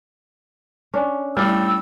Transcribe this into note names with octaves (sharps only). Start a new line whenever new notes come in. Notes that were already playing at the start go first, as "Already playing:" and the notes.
C#4 D4
A2 G3 F5 E6